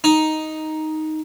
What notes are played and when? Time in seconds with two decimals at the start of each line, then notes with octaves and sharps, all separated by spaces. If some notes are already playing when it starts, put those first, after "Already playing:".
0.04 D#4